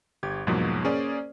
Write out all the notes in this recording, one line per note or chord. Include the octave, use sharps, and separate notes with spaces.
G1 G4 G#6
E2 G#2 B2 F3 F#3 A#3
A#3 C#4 G#4 C5 D5